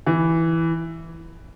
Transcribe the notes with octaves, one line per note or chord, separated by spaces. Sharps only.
E3